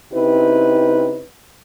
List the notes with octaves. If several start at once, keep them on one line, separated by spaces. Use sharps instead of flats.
C#3 C4 D#4 E4 G4 B4